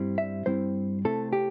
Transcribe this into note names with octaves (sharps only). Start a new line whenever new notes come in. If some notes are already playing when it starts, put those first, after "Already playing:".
Already playing: G2 G3 C4 E4
E5
G2 G3 C4 E4 C5
C3 A3 C4 E4 A4
G4